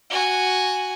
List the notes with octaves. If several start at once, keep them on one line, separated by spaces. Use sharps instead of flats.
F#4 G#5